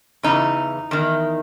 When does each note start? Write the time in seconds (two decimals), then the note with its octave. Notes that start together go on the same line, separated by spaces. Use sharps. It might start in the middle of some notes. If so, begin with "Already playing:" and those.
0.23 E2 C#3 E3 D#4
0.91 E2 D#3